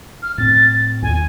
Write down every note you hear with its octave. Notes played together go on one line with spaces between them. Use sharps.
F6
A2 C4 A6
D#2 G#5